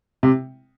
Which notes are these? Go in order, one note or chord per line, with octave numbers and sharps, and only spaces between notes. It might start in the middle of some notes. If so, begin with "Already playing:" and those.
C3